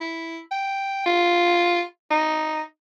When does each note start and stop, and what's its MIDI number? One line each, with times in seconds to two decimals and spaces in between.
0.01 0.39 64
0.51 1.03 79
1.06 1.82 65
2.11 2.62 63